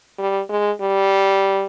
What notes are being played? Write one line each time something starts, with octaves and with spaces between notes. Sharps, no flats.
G3
G#3
G3